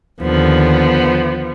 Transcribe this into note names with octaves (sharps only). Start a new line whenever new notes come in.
D#2 D3 F3 B3